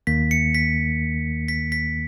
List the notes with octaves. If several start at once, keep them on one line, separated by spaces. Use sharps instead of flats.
D#2 D#3 A#3 B6
C#7
B6
B6
B6